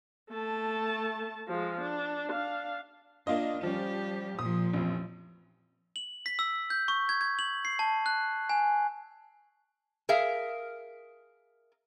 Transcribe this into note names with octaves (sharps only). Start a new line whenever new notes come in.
A3 A5
F3 G#3
D4
D4 F5
A#3 D4 F4 D#5
F3 G3 C#4 G4
A#2 F3 D#6
A1 F2
F#7
B6
E6
G6
C#6
G#6
G#6
F#7
C7
A5
F#6
G#5
G#4 A#4 E5 F5